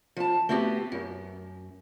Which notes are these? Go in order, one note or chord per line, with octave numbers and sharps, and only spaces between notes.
F3 A5
A3 B3 C4 F#4 G4
F#2